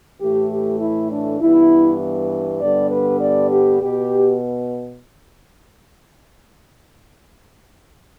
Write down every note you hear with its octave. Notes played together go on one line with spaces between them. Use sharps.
A2 E3 A3 G4
G4
E4
D4
G2 E3 B3 E4
G2 D3 G3 B3 D5
B4
D5
G4
B2 B3 G4